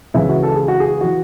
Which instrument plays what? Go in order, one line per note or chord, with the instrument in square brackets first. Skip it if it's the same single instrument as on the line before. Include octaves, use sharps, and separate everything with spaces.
[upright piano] C#2 C#3 E3 E4
F#4
A4
G#4
F#4
G#4
E3 F#4